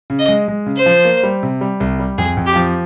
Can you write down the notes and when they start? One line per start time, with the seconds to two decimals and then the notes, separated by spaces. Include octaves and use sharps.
0.10 C#3
0.19 D#5
0.28 G#3
0.48 G#3
0.66 C#3
0.76 C5
0.86 F3
1.05 A#3
1.23 G3
1.43 C3
1.61 G3
1.80 C2
1.99 G3
2.18 F2 G#4
2.37 F2
2.46 G4
2.56 F3